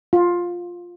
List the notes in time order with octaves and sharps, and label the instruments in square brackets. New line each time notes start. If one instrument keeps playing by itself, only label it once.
[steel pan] F4